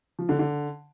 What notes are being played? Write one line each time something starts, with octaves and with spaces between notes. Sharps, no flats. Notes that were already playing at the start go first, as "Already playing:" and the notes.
F3
D3
D3